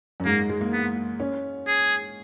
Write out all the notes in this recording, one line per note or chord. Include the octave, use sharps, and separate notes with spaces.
F#2
G#2 A#3
G#3
A#3
B3
C#4
G#4